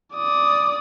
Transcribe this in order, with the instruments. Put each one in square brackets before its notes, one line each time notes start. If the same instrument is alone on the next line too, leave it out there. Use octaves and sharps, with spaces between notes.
[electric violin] D5 D#6